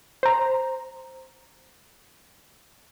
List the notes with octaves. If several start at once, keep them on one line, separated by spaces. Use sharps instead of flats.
C5 A#5